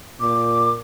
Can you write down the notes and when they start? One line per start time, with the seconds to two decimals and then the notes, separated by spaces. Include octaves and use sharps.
0.20 A#2 D6